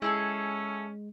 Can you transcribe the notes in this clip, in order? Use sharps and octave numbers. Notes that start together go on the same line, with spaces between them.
G#3 C#4 E4 G#4 A4